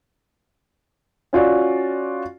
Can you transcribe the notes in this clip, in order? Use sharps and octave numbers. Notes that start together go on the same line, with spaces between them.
C#4 F4 F#4 D5